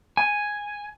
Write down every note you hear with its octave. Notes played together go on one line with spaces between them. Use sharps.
G#5